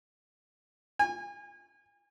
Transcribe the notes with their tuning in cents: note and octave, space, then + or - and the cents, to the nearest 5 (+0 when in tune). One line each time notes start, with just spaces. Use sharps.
G#5 -35